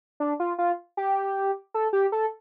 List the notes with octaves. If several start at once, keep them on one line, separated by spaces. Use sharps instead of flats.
D4
F4
F4
G4
A4
G4
A4